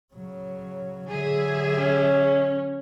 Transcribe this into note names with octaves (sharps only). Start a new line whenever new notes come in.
C#3 F#3
D3 F#3 G#4 E5
C#4